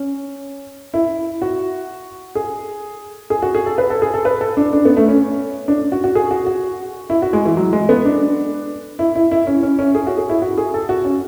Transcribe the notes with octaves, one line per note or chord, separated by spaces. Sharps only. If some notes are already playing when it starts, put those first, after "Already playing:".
Already playing: C#4
E4
F#4
G#4
G#4
F#4
G#4
A4
B4
A4
G#4
A4
B4
A4
D4
D4
B3
A3
C#4
D4
F#4
F#4
G#4
F#4
F#4
E4
F#4
G#3
E3
F#3
G#3
B3
D4
E4
E4
E4
C#4
C#4
C#4
G#4
F#4
G#4
E4
F#4
G#4
A4
F#4
C#4